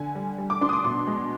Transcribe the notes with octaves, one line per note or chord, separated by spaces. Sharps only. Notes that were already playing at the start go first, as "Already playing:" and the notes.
Already playing: D3 G#5
G3
G3
D6
D4 C6
D#6
D6
B2 C6
G#3